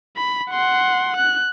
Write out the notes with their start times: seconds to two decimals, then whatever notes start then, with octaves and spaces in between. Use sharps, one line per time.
0.17 B5
0.51 F#5 C6
1.17 F#6